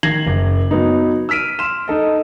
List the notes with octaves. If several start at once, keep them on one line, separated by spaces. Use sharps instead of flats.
D#3 G#6 A#6 C7 F#7
F#1
F#3 B3 D#4
E6 F6 B6 D7 D#7
C6 F6 E7
D#4 A4 D#5